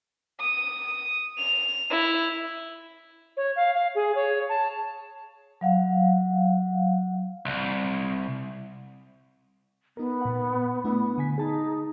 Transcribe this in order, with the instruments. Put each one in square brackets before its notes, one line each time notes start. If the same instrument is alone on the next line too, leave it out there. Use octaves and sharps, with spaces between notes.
[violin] D#6
F7
E4
[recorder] C#5
F5
F5
G#4
C#5
A5
[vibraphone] F#3 F5 F#5
[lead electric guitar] C2
[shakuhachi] B3 [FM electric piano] D#4 A#4
[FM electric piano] A#2 F#5
[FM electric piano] A3 D4 E4 [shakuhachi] B3
[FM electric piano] D3 G#5 B6
[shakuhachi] D#4 [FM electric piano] G#4 A5